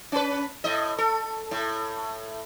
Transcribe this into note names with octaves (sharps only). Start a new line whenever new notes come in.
C#4 B4
A2 D#5
A4
A2